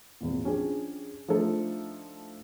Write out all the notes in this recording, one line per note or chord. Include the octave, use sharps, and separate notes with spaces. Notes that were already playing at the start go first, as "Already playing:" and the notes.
G#1 E2 A#2
F3 C#4 D4 G4 G#4
F3 A3 D4 D#4 A4